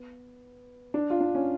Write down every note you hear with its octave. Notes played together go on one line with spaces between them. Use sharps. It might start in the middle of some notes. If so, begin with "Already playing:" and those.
Already playing: B3
D4
F4
D4
C#4